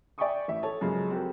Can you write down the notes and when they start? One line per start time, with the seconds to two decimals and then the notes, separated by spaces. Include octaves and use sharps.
0.18 D5 E5 G5 G#5 C#6 D#6
0.48 A1 E5
0.63 A4 C#5 A5
0.81 F#2 C#3 F3 G#3 A#4
1.11 C4 F#4 G4 A4 A#4